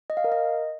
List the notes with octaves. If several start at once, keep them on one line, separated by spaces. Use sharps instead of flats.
D#5
F5
A#4
D#5